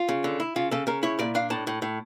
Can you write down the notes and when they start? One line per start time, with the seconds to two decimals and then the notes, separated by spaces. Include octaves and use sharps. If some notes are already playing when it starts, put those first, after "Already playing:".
Already playing: F4
0.09 C#3
0.24 D3
0.40 E4
0.56 C#3 F4
0.71 C#3 A4
0.87 C#3 A#4
1.03 E4 C#5
1.19 A#2 D5
1.35 D4 F5
1.50 A2 A5
1.67 A2
1.82 A2